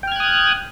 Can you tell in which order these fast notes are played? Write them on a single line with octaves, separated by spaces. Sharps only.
G5 F6 G#6 F#6 D#6